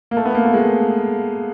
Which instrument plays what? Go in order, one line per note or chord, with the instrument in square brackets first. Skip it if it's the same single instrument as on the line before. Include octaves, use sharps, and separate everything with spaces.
[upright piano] A#3
A3
B3
A#3
A3
G#3